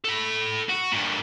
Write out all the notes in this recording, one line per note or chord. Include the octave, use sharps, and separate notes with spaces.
A4 B5
F#4
G2 A#2